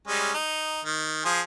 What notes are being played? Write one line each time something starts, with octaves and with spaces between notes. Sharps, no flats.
G3 G#3 C#4
D#4
D#3
F3 G#4 C5